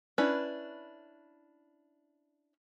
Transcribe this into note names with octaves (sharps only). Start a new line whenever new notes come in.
C#4 D4 E4 B4